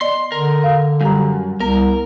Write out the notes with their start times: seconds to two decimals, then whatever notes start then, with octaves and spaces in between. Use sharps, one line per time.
0.01 B3 D5 D#5 C6
0.32 D3 A#4
0.64 F5
1.01 F#2 G3 G4 A#5
1.60 C2 B3 A#4